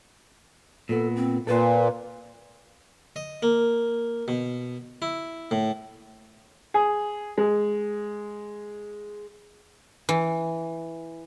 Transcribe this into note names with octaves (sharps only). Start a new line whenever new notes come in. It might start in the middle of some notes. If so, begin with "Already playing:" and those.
A#2 B3 A4
C4
A#2 A4 B4 C5
D#5
A#3
B2
E4
A2
G#4
G#3
E3